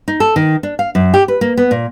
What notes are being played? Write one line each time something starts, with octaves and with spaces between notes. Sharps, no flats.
D#4
A4
D#3
D4
F5
F#2
G4
B4
A#3
B3
A#2